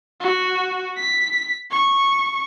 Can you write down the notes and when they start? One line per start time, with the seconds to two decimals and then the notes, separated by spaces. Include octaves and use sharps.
0.21 F#4
0.97 B6
1.71 C#6